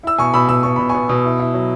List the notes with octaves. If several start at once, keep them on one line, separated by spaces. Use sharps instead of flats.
E4 E6
B2 G#5 C#6
B2 B5 E6
B2 E6
B2 C#6
B2 B5
G#5 C#6
B3
B2
E4
E4
F#3